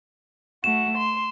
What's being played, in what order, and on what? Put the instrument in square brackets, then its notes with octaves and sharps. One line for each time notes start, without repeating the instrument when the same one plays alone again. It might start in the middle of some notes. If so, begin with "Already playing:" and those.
[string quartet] A3 F#4 [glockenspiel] E7
[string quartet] C6